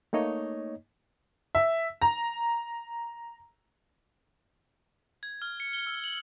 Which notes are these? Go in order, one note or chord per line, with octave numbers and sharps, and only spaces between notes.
A3 A#3 D#4 C#5 D#5
E5
A#5
G#6
F6
C#7
G7
E6
F#7